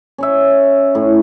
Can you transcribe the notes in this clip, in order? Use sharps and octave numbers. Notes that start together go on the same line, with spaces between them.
C#4 C#5 E5
A2